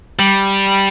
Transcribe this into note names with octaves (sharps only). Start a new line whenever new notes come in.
G3